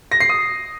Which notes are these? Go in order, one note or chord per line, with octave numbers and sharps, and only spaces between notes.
A#6
C7
D#6